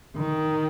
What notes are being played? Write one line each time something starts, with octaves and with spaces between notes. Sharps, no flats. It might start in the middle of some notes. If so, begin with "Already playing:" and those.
D#3